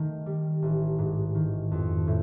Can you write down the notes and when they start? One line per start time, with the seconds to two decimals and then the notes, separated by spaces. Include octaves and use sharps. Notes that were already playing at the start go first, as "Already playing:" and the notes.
Already playing: D#3 A3
0.26 G3
0.62 A1
0.98 G#2
1.35 D#3
1.71 F2
2.07 A2